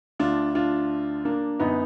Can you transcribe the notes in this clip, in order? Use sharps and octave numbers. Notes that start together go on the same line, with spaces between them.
D2 D3 D4 F4
D4 F4
A#3 D4
F#2 D3 B3 D#4